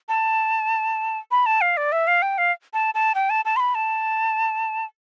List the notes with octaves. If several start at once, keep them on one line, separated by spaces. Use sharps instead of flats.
A5
B5
A5
F5
D5
E5
F5
G5
F5
A5
A5
G5
A5
A5
C6
B5
A5